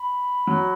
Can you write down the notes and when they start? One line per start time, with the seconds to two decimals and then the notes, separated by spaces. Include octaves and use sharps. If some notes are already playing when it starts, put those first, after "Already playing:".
Already playing: B5
0.47 F#3